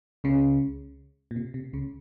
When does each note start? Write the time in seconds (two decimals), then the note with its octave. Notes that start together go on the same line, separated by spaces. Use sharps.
0.24 C#2 C#3
1.31 A#2
1.36 C3
1.54 C3
1.73 C#2 C#3